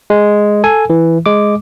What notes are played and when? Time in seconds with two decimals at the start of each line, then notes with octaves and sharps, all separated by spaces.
0.10 G#3
0.64 A4 G#5
0.90 E3
1.26 G#3 D6